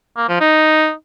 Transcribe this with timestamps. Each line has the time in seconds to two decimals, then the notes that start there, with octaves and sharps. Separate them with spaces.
0.17 A#3
0.29 F3
0.41 D#4